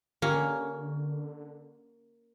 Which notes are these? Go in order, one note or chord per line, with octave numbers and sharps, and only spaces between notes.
D3 A#3 C#4 F4 G4 A#4